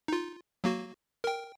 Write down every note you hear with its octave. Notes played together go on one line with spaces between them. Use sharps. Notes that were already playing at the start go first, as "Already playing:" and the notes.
D#4 F4
F#3 A#3 F#4
A#4 G5